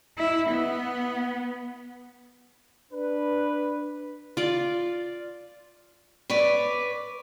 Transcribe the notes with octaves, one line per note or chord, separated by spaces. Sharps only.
E4
B3
D4 B4
F4 D5
B4 C#5 D5